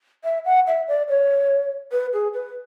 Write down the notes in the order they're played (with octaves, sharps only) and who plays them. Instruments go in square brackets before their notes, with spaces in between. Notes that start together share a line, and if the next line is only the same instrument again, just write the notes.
[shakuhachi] E5
F#5
E5
D5
C#5
B4
G#4
B4